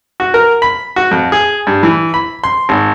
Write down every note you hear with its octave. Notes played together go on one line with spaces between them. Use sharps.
F#4
A#4
B5
F#4
F2
G#4
G2
E3
B5
C6
G#1